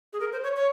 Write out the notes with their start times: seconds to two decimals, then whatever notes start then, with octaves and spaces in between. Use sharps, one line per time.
0.13 G#4
0.20 A#4
0.32 C5
0.43 C#5
0.56 C#5